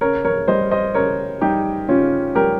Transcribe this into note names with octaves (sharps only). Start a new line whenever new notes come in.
C#3 A#4 C#5
A#4 C#5
G3 C5 D#5
C5 D#5
C#3 A#4 C#5
G3 D#4 G4
C#3 C#4 F4
G3 G4 A#4